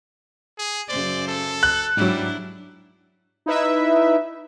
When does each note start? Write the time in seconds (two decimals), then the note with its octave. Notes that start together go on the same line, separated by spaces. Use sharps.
0.58 G#4
0.89 F#2 C#3 C5 D5
1.28 A4
1.63 F#6
1.97 G#2 F#3 G3 D4 E4
3.46 D#4 E4 B4 E5